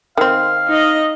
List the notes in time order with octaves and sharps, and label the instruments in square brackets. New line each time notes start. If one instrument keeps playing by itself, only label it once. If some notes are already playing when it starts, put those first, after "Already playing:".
[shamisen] D#3 C4 [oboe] F5
[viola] D#4 D#5